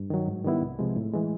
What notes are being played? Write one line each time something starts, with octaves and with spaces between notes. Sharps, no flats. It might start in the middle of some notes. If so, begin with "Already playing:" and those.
Already playing: G2
D#3 F#3
G#2
D#3 G3 B3 E4
C2
C3 F3 G#3
A2
E3 G#3